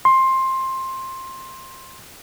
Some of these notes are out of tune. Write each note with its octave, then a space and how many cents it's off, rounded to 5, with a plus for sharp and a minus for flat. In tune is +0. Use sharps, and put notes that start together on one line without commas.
C6 +15